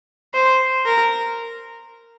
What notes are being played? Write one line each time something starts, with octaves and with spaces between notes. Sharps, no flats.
C5
A#4